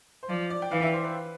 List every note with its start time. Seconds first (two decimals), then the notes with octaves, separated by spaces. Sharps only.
0.23 C5
0.29 F3 D5
0.50 D5
0.62 G5
0.71 E3 F5
0.83 E5
0.93 C5
1.04 B4